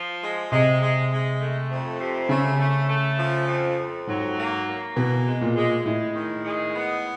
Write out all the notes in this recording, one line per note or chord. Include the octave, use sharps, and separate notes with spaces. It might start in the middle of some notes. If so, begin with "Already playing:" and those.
Already playing: F3
G#3
C3 G#3
G#3
G#3
A3
F2
C3
C#3 A3
A3
A3
F3
F2
F2
G#2 F#3
A#3
A#3
B2 E3
G#3
A#2
G#3
A2 G#3
D#3
G#3
B3